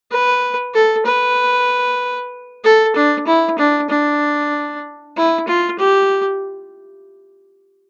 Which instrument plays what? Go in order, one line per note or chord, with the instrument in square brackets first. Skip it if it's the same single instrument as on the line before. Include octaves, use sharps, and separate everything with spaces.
[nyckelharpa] B4
A4
B4
A4
D4
E4
D4
D4
E4
F4
G4